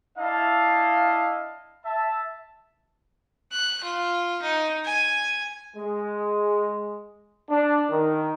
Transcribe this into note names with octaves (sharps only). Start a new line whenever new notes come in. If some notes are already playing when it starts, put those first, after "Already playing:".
D4 E4 D#5 F5 A5
E5 A5
F#6
F4
D#4
G#5
G#3
D4
D#3